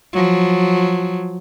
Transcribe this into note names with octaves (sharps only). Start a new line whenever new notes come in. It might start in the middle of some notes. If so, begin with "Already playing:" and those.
F3 F#3